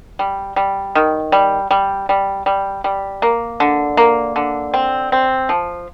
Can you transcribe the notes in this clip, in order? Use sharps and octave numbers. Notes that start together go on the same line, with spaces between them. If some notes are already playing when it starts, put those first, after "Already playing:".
G3
G3
D#3
G3
G3
G3
G3
G3
A#3
D3
A#3
D3
C4
C4
F3